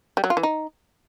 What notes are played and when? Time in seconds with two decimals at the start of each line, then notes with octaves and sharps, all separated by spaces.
0.17 G3
0.24 F#3
0.30 F4
0.37 E3
0.43 D#4